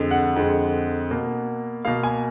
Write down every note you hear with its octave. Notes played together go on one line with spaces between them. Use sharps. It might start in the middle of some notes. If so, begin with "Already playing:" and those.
Already playing: F2 D3 G#3
F#5
F2 D3 G#3
B2 A#3
B2 A#3 F5
G#5